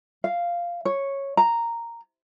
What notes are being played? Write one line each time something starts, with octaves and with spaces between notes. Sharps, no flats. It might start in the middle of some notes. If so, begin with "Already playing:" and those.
F5
C#5
A#5